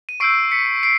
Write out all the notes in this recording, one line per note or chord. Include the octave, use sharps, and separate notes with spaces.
D#7
C#6 E6 G6 C7 D7
B6 C#7
C7 D7